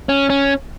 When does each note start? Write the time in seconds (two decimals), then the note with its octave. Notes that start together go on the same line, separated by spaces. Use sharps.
0.09 C#4
0.30 C#4